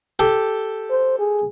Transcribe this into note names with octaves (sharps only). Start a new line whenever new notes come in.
G4 A4
C5
G#4